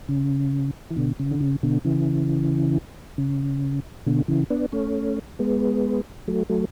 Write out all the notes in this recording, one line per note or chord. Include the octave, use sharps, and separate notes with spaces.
C#3
E3
B2 D3
C#3
D3
C#3
B2 D3
C#3 E3
C#3
B2 D3
C#3 E3
B3 D4
A3 C#4
G#3 B3
F#3 A3
F#3 A3